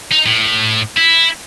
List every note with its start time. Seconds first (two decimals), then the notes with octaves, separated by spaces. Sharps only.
0.12 D#4
0.26 A2
0.97 E4